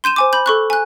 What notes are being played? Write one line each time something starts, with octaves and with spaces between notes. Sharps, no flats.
C6 G6 D#7 E7
C5 G#5 D6
B5 G6
A4 C#6 F#6
G#5 F#6